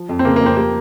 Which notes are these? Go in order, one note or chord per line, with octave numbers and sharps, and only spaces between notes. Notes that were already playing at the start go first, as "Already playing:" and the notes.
Already playing: F3
F2
C4
C#3 A#3
A#3
F2
C4
A#3 G4